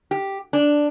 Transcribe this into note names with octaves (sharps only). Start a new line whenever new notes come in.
G4
D4